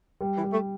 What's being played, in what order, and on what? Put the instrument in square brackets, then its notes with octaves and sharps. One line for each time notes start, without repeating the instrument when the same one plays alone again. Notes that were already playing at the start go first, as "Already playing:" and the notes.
[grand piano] G3
[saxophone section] E3
[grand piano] G3
[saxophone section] A3